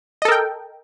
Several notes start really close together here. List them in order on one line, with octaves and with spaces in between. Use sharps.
D#5 A4 A#4 G5